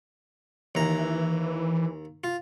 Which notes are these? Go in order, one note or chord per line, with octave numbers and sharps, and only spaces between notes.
D#2 E3 A#5
F4